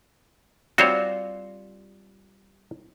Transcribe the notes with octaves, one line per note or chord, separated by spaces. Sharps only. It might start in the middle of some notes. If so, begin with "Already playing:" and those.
G3 C4 F4 F#4 C5 C#5